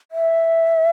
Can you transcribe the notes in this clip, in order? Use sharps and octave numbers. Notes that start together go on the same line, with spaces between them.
E5